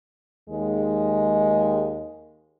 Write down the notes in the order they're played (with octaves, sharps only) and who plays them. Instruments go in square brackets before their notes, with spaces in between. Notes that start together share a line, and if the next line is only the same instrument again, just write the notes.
[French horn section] D#2 G#3